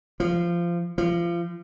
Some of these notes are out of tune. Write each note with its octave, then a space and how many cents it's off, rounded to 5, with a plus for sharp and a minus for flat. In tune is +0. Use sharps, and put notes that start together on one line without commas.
F3 -20
F3 -30